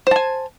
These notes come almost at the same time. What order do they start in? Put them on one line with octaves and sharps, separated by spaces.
C5 A5 G#5